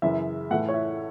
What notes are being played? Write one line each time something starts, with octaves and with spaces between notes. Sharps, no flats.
F#2 C#3 E3 E5
A2 E3 A3 F#5
C#5
E5